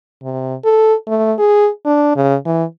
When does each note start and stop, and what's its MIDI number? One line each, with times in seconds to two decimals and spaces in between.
0.22 0.55 48
0.64 0.94 69
1.07 1.33 57
1.39 1.69 68
1.86 2.15 62
2.16 2.35 49
2.45 2.64 52